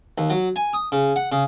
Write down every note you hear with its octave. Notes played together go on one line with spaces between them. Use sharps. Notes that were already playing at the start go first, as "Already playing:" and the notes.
D#2
F#3
G#5
D#6
C#3
F#5
C#3